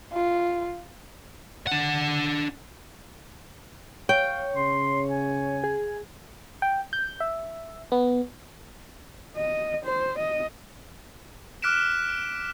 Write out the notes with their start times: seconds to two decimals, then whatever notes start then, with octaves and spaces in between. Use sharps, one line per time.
0.13 F4
1.67 D4 F#5
4.09 C#5 F5 G5
4.56 C#3 C6
5.09 G#5
5.64 G#4
6.62 G5
6.93 G6
7.20 E5
7.92 B3
9.37 D#5
9.85 C5
10.18 D#5
11.62 D6 F6 F#6 B6 D7 E7